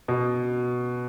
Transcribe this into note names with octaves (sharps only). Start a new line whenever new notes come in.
B2